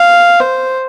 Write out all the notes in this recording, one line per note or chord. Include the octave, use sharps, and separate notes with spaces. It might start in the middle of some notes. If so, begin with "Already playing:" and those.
Already playing: F5
C5